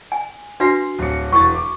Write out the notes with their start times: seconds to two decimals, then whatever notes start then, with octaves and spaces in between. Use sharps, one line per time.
0.12 G#5
0.60 D4 F#4 B4 C6 A#6 C7
0.99 D1 C#7
1.32 E1 E3 C#6 A6
1.55 D6